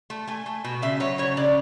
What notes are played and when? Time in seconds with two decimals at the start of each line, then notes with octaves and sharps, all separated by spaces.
0.10 A3
0.27 A3 G#5
0.46 A3
0.64 B2
0.82 C#3 E5
1.00 F#3 C#5
1.18 C#3 C#5
1.37 C#3 D5